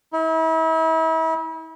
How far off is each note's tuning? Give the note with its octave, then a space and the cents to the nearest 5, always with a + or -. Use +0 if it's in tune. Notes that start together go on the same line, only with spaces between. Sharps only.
E4 -40